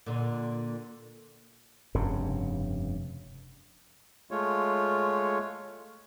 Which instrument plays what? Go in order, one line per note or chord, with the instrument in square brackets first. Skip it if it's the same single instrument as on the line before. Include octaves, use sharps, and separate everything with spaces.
[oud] A#2 D3
[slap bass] F1 G2 C#3
[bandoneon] G#3 A3 F4 C#5